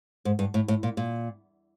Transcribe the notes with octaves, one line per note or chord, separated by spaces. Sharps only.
G#2
G2
A2
A2
A#2
A#2